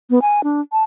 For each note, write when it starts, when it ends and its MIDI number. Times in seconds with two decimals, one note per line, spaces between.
0.10 0.19 59
0.22 0.44 80
0.44 0.61 62
0.72 0.84 81